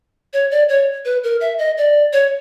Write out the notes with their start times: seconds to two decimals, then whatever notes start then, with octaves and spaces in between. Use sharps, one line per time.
0.33 C#5
0.51 D5
0.69 C#5
1.05 B4
1.24 A#4
1.41 E5
1.59 D#5
1.77 D5
2.13 C#5